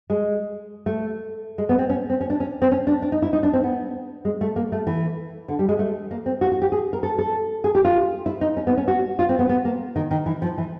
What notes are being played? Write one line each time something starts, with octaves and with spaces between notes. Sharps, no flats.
G#3
A3
G#3
B3
C4
C#4
C4
C#4
D4
C#4
C4
C#4
D4
D4
D#4
E4
D#4
D4
C4
B3
G#3
A3
A#3
A3
E3
D3
G3
G#3
A3
A#3
C4
F#4
F#4
G4
G#4
A#4
A4
A4
G#4
G4
F4
E4
D#4
C#4
B3
C#4
F#4
F4
C4
B3
B3
A#3
D#3
D#3
E3
F3
E3